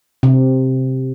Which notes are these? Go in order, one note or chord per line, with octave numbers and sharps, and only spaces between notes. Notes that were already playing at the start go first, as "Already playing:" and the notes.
C3